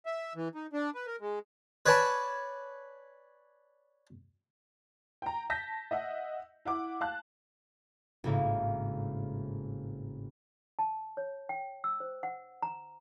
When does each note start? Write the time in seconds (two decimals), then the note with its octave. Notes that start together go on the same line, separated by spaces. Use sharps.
0.06 E5
0.35 E3
0.55 D#4
0.73 D4
0.95 B4
1.07 A#4
1.21 G#3
1.86 B4 C#5 D5 G#5 A5 B5
5.22 G5 A#5
5.50 A5 G6 A#6 B6
5.91 D#5 E5 F#5
6.65 E4 F#5 D6
7.01 F5 A5 F#6
8.24 G#1 A2 C#3 A#3 E4 F5
10.79 A5
11.17 C#5
11.49 G5
11.84 E6
12.00 C5
12.23 F#5
12.62 A#5